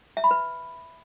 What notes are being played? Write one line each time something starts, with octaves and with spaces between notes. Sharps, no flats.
E5
B5
B4